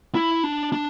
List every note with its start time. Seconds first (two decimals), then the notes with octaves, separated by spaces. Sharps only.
0.15 E4
0.44 D4
0.72 D4